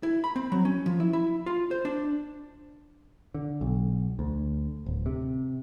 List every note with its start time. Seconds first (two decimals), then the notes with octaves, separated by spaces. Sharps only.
0.03 E4
0.24 B5
0.36 C4
0.52 F#3
0.65 C#4
0.86 F3
1.00 E4
1.13 E4
1.46 F4
1.71 C5
1.85 D4
3.34 D3
3.61 B1
4.19 D2
4.86 D1
5.06 C3